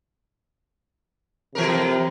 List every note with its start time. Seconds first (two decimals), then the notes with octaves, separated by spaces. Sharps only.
1.55 C3 E3 A3 A#4